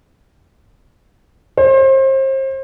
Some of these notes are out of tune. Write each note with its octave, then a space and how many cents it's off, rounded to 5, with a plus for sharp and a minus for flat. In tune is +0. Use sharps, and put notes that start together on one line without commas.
C5 +35